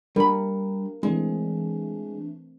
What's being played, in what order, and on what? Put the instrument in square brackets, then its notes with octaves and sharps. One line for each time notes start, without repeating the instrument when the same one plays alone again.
[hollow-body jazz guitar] G3 B5 [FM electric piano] D4 [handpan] A#4
[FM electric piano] E3 A3 D4 [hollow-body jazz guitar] G#3 [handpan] C4